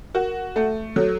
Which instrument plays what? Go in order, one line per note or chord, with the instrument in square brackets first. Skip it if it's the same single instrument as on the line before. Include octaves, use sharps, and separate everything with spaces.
[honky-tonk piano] F#4 [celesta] A#4
[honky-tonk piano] A3 [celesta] A4
[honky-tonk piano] F#3 [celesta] A4